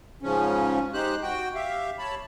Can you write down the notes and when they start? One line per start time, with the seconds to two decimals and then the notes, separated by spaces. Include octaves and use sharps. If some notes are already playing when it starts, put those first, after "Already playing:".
0.23 G#2 C#3 F3 C#4
0.93 G#3 D#4 G4 C5 F#6
1.23 F#4 G5
1.54 G4 E5 F5
1.98 C#5 A5 B5